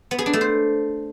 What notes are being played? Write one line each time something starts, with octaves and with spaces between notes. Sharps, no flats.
B3
G#4
D4
A3
C5